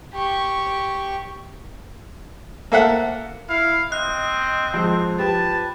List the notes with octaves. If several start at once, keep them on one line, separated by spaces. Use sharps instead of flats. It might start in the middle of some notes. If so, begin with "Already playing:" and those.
G4 C#6
A#3 A4 E5 F#5
E4 F5
C4 D#5 F#6
F2 G#3 C5
F3 G4 B4 A5